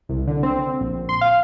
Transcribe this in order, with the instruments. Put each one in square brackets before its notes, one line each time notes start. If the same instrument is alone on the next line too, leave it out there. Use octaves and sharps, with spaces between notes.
[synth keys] C2
D3
C4
A#1
C6
F5